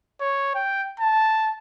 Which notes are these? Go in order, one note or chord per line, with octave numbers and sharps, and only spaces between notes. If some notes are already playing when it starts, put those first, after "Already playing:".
C#5
G5
A5